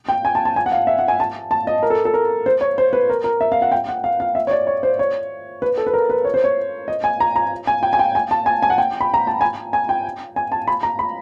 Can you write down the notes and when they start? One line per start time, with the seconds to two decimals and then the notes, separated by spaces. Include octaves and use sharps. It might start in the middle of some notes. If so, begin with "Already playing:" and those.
0.08 G5
0.25 G#5
0.35 A5
0.45 A5
0.56 G#5
0.66 F#5
0.72 F5
0.87 E5
0.99 F#5
1.08 G#5
1.20 A5
1.51 A5
1.67 D#5
1.83 A#4
1.90 A4
2.05 A4
2.14 A#4
2.46 C5
2.61 C#5
2.78 C5
2.93 B4
3.10 A#4
3.24 A#4
3.41 E5
3.52 F5
3.62 F#5
3.72 G5
3.89 F#5
4.04 F5
4.20 F5
4.35 E5
4.47 C#5
4.51 D5
4.67 C#5
4.83 C5
4.99 C#5
5.62 B4
5.78 A4
5.87 B4
5.94 A#4
6.10 B4
6.25 C#5
6.34 C5
6.44 C#5
6.88 D#5
7.04 G#5
7.20 A#5
7.36 A#5
7.67 G#5
7.83 G5
7.93 G#5
7.99 G5
8.15 G#5
8.31 A5
8.46 G#5
8.62 G#5
8.70 F#5
8.78 G5
9.01 B5
9.14 A#5
9.27 A5
9.41 G#5
9.73 G#5
9.89 G5
10.36 G#5
10.52 A5
10.68 B5
10.83 A#5
10.99 B5